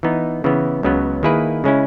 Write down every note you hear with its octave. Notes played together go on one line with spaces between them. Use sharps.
E3 B3 D#4
C#3 E3 B3
C#2 C#3 F#3 B3
D#3 A#3 E4 G#4 B4
C#3 G#3 C#4 E4